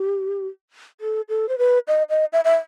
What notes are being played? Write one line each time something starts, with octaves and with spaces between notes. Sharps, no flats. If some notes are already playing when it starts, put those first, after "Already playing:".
Already playing: G4
A4
A4
C5
B4
D#5
D#5
E5
E5